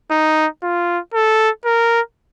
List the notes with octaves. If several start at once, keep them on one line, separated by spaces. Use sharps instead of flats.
D#4
F4
A4
A#4